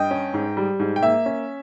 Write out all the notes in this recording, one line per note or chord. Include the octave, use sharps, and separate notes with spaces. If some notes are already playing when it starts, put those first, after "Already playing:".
Already playing: G2 D#5 G5
C#4
G#2
G3
G#2
G5
A#3 E5
C#4